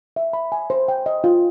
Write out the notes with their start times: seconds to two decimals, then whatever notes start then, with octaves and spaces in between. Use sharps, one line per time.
0.16 E5
0.33 B5
0.52 G#5
0.70 C5
0.88 G5
1.06 D#5
1.24 F4